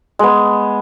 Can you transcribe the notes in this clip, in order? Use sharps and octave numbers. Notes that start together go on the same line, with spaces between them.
G#3 B3